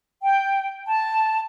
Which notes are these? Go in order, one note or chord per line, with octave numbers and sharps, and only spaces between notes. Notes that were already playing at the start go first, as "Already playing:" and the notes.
G5
A5